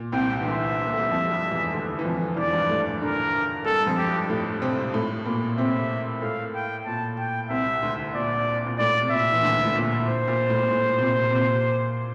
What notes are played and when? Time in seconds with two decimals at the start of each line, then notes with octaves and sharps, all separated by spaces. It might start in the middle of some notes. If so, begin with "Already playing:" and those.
Already playing: A#2
0.12 C2 C3 G5
0.40 E3
0.45 D2 D3 E5
0.85 A#3
0.93 A3
1.01 G3
1.09 F2 F3
1.30 G2 G3
1.51 E2 E3
1.73 D2 D3
1.99 E3
2.05 F2 F3
2.37 E2 E3 D5
2.50 F3
2.53 G2 G3
2.70 A2 A3
3.02 D3 D4 A#4
3.66 G2 G3 A4
3.87 F2 F3
3.98 G4
4.08 G2 G3
4.29 A2 A3
4.62 C3 C4
4.94 A2 A3
5.25 A#2 A#3
5.58 C3 C4 E5
6.22 A2 A3 F5
6.55 G5
6.86 A#2 A5
7.19 G5
7.50 C2 C3 E5
7.83 D2 D3
8.15 A#2 D5
8.67 A#2
8.79 A2 D5
9.02 C3
9.11 A#2 E5
9.32 E3
9.42 D2 D3
9.64 A2
9.75 A#2
10.07 C5
10.28 A#2
10.50 A2
10.63 A#2
10.71 A2
10.98 C3
11.03 A#2
11.30 C3
11.35 A#2